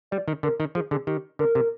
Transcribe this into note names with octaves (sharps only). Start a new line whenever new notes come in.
G3 D5
D#3
D3 A#4
D#3
F3 G#4
D3 G#4
D#3 G4
D3 A#4
C3